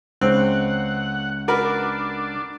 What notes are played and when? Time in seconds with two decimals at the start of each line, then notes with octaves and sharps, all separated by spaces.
0.21 C#2 C4 F#5
1.48 D4 F#4 A#4 B4